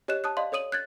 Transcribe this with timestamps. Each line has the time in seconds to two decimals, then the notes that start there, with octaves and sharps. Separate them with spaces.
0.08 G4 C#5 D#5 F#6 E7
0.24 A5 D#6 F#6
0.37 D5 D#5 F5 C6
0.52 A4 C#5 D#6 D#7 F#7
0.72 F#6 G#6 A6